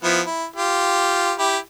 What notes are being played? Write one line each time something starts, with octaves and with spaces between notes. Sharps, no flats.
F3 B3 E4
E4
F4 G4
E4 G4